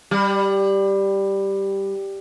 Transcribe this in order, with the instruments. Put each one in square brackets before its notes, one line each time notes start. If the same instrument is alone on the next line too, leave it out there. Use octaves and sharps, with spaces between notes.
[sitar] G3